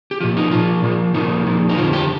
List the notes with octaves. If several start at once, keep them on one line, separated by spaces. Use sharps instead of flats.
G4
A#2 F3 F4
D#4
A#2 F3 F4
A#2 F3
A#2 F3 D#4
A#2 F3
D#4
F2 D3 F3 F4
G4